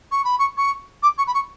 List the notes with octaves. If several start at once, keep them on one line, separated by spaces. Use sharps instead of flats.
C#6
B5
C#6
C#6
D6
C#6
B5
C#6